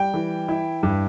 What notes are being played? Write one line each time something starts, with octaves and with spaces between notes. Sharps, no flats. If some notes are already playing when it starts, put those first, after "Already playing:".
Already playing: G3 G5
E3
E4
G2